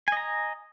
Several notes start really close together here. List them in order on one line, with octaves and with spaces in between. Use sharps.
G#5 D#5 A#5